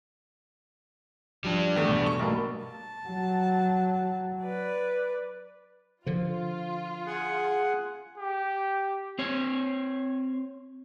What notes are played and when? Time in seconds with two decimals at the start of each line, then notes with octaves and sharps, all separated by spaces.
1.44 F3 G3 D4
1.76 E2 A3
1.89 B2
2.06 C#6
2.19 B1 G2 A#3
2.64 A5
3.08 F#3
4.42 B4 D5
6.06 D3 F3 F4
7.06 G#4 F#5
8.18 G4
9.19 C4 C#5